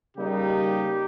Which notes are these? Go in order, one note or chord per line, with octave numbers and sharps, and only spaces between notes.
C#3 G3 A#3 D#4 G4